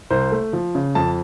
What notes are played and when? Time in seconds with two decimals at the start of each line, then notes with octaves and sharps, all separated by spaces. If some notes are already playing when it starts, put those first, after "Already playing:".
0.11 C2 C5
0.32 A3
0.53 F3
0.75 C#3
0.95 F2 A5